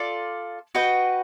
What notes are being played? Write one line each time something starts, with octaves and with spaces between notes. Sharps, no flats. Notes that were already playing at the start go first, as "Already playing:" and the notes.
Already playing: F4 A4 D5
F#4 B4 D#5 G5